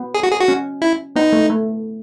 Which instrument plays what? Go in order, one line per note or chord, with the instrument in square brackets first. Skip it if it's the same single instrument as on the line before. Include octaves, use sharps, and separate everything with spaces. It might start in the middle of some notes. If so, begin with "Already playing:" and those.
Already playing: [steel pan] B3
[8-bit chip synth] G#4
F#4
G#4
F#4
[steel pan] C#4
[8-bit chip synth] E4
[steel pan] B3 [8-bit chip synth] D#4
[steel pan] A3
A3